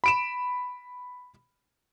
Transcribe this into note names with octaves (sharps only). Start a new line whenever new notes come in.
B5 D7 E7